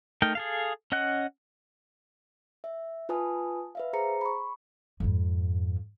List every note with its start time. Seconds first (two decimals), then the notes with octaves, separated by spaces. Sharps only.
0.22 A3 D#4 A#4 G5
0.35 G#4 A4 F5
0.92 C#4 D#5 F#5 F#6
2.64 E5
3.09 F4 B4 G#5 A5 D#6
3.75 B4 E5 F5
3.93 G#4 C5 A#5 C#7
4.21 B5 C#6
5.00 F2 G#2